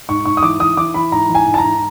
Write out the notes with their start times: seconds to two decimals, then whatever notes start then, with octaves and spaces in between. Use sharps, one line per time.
0.09 G#2 C#6
0.25 G#2 C#6
0.37 D#6
0.43 E3 D6
0.60 E3 D#6
0.77 E3 D6
0.94 E3 B5
1.12 G#2 A#5
1.29 E3
1.35 G#5
1.47 G#2
1.54 A5
1.58 A#5
1.64 G#2